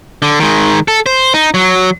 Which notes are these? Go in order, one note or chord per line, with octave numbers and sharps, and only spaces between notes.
D3
D#3 G#3
A4
C5
D#4
F#3